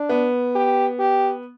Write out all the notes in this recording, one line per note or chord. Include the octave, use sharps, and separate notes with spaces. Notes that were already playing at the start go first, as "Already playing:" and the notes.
Already playing: D4
B3
G4
G4